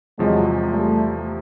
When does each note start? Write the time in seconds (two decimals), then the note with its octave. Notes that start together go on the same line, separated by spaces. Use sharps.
0.19 E2 C3 F3 F#3 G#3
0.69 G3 A3